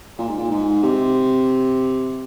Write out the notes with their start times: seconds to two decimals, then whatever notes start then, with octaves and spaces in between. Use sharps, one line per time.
0.18 A#2
0.29 G#2
0.38 A#2
0.51 G#2
0.83 C3